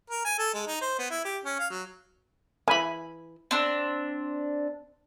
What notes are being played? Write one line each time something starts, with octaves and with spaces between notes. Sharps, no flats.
A#4
G#5
A4
G#3
D#4
C5
B3
E4
G4
C#4
F5
F#3
D#3 E3 G#5 B5
C4 D4